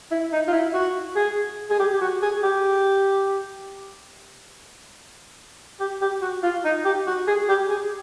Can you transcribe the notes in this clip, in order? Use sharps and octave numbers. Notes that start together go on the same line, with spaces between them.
E4
D#4
F4
E4
F#4
G#4
G#4
G4
G4
F#4
G#4
G4
G4
G4
F#4
F4
D#4
G4
F#4
G#4
G4
G#4